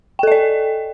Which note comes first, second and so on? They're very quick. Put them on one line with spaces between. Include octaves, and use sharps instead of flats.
G5 A4 D#5 D5